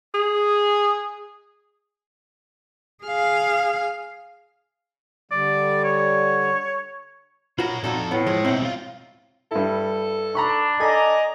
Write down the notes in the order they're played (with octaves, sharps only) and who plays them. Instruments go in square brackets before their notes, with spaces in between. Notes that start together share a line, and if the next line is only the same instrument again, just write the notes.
[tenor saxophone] G#4
[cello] G#4 F5
[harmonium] D3 G3 [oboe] D5
[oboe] C#5
[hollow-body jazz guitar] F4 F#4 A#4 [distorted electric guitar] C#5 B5
[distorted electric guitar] F2 A4 [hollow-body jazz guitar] A#2 D#4 F#4
[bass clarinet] A2 [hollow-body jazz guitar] B3
[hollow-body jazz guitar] F3 [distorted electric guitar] G#3
[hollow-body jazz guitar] B2 C4 [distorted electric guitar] D#4 E5
[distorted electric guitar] G3 F4
[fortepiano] G2 E4 [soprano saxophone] A4
[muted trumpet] D4 [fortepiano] A#5 B5 C#6
[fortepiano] A4 [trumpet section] D5 D#5 A#5 [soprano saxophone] G#5